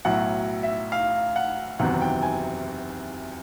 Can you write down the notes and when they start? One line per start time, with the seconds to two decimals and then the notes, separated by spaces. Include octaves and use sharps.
0.05 B1 A2 F#3 F#5
0.63 E5
0.92 F5
1.36 F#5
1.79 F#1 E2 C3 D#3 F#3 F#5
2.01 G5
2.23 G#5